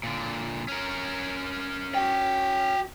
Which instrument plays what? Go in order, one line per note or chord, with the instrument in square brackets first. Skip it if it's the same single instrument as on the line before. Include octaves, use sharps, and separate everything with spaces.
[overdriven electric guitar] A#2 D3
C#4 A#4
[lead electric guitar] F#4 G5